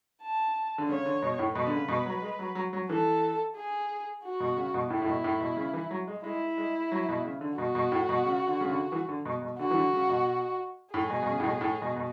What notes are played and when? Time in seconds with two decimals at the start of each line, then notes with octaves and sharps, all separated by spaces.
0.22 A5
0.78 D3
0.89 C#3 C#5
1.06 D3
1.22 B2
1.39 A2
1.55 B2 B4
1.67 D3
1.73 C#3
1.88 B2
2.06 F#3
2.22 G#3
2.39 F#3
2.55 F#3
2.73 F#3
2.89 E3 A4
3.56 G#4
4.24 F#4
4.40 B2
4.57 C#3
4.74 B2
4.90 A2 E4
5.02 A2
5.07 B2
5.24 A2
5.41 B2
5.57 C#3
5.73 E3
5.91 F#3
6.07 G#3
6.24 G#3 E4
6.57 G#3
6.92 F#3
7.09 B2
7.25 C#3
7.41 D3
7.58 B2 F#4
7.75 B2
7.92 A2
8.09 B2
8.25 C#3
8.47 D3
8.61 C#3
8.70 D3
8.92 E3
9.09 D3
9.25 B2
9.42 B2
9.59 D3 F#4
9.71 E3
9.75 D3
9.93 C#3
10.09 B2
10.93 A2 G#4
11.10 B2
11.23 B2
11.27 C#3
11.40 A2
11.44 B2
11.61 A2
11.82 B2
11.96 B2